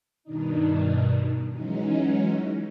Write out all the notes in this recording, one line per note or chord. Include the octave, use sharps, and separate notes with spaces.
G2 B2 D#3 D4 D#4
E3 F#3 G#3 C#4 D#4